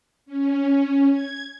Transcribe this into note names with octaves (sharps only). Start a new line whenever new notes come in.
C#4
G#6